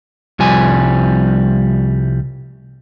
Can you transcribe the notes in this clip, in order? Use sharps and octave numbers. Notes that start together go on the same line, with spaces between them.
C2 F3 G3 G#5